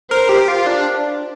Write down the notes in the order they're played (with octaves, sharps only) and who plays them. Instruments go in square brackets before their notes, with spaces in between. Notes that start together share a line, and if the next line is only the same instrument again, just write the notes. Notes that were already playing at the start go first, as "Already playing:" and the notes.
[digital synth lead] A#4 [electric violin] C5
[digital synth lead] G4
F4
D4